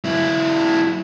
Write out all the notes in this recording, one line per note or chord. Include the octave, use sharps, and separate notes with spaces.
F#3 E4